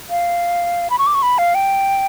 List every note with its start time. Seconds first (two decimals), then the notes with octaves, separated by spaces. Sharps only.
0.10 F5
0.90 B5
0.99 C#6
1.07 D6
1.15 C#6
1.22 B5
1.38 F5
1.55 G5